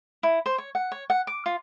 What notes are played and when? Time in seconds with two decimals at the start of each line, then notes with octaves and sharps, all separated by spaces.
0.23 E4
0.46 C5
0.58 C#5
0.75 F#5
0.92 C#5
1.10 F#5
1.27 D6
1.46 F4